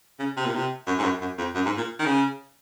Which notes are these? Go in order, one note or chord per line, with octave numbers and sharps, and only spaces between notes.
C#3
C3
A#2
C3
F#2
G#2
F#2
F#2
F2
F#2
G#2
A#2
D#3
C#3